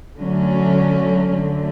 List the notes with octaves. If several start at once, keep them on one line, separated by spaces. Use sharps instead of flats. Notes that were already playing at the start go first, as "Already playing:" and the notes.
D3 F#3 A3 C#4
D3 F#3 A3